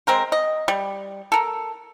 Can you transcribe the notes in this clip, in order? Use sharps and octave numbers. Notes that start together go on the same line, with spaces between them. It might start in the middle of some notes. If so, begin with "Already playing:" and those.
G#3 C4 A#4 C5
D#5
G3
A4 A#4